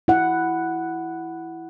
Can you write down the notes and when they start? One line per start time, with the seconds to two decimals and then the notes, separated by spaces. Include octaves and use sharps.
0.08 E4 F#5